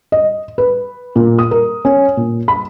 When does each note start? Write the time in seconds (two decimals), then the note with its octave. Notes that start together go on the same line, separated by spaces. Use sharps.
0.12 D#5
0.58 B4
1.16 A#2
1.39 D#6
1.51 A#4
1.85 C#4
2.17 A#2
2.48 B5